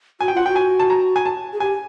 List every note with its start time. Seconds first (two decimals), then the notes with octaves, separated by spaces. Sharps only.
0.21 F#4 G#5
0.28 G5
0.34 F4 F#5
0.46 F#4 G5
0.56 G#5
0.80 A5
0.90 A#5
1.16 G#5
1.26 A5
1.53 G#4
1.60 G4 G#5